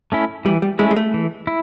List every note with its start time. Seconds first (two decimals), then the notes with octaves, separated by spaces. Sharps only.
0.12 A3 C#4 E4
0.45 E3 G3
0.62 G3
0.79 G#3 A3 C#4 E4
0.91 G#3
0.96 A3
1.14 E3
1.47 E4